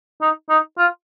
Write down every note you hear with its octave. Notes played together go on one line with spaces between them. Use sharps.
D#4
D#4
F4